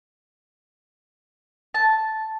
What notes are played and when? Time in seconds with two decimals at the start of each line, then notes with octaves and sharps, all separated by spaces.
1.74 A5